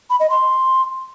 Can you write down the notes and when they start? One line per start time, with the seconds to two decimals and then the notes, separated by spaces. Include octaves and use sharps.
0.10 B5
0.20 D#5
0.30 C6